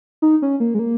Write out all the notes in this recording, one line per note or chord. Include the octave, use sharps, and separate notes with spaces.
D#4
C#4
A#3
G#3
A#3